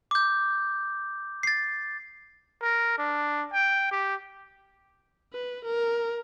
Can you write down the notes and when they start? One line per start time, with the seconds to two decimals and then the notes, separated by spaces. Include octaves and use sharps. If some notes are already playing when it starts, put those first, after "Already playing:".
0.11 D6 G6
1.43 A6 C7
2.62 A#4
2.99 D4
3.53 G5
3.92 G4
5.33 B4
5.65 A#4